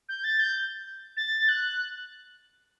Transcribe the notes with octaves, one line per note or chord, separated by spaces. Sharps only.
G6
A6
G6
A6
F#6